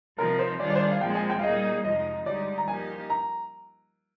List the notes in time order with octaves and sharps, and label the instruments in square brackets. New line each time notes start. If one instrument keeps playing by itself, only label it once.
[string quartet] C3 F3 C4 D#4 [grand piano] A#4
[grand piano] C5
[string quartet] D#3 G3 D4 F4 G#4 [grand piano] D5
[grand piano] D5
C5
D5
F5
[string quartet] A#2 F3 G#3 C4 [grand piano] G5
[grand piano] G#5
G5
F5
[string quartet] A#2 G3 A#3 D#4 G#4 [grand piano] D#5
[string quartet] F2 C3 F3 G#3 D#4 [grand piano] D#5
[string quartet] G2 D3 G#3 D#4 G4 [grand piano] D5
[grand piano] A#5
[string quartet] F3 A#3 D#4 G4 [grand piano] G#5
[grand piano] A#5